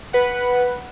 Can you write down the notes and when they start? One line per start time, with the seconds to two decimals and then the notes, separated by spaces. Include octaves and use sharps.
0.13 B4 F#5